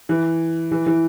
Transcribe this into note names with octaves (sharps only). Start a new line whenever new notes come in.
E3
E3
E3